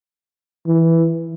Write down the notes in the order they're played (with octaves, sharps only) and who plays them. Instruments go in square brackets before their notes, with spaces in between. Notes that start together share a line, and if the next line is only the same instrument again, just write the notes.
[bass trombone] E3